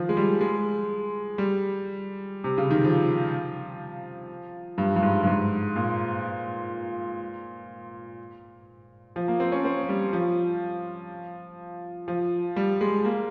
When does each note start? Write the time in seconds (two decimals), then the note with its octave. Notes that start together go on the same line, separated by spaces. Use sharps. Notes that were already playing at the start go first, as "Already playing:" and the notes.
Already playing: D#3 F3
0.09 G#3
0.17 G3
0.41 G#3
1.38 G3
2.44 C3
2.58 C#3
2.71 D#3
2.84 F3
4.78 G2
4.96 G2
5.03 G#2
5.23 G2
5.27 G#2
5.76 A#2
9.16 F3
9.28 A#3
9.40 C4
9.52 C#4
9.65 C4
9.89 G3
10.13 F3
12.08 F3
12.56 G3
12.81 G#3
13.05 A#3